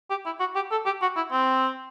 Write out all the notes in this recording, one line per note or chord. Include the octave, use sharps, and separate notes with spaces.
G4
E4
F#4
G4
A4
G4
F#4
E4
C4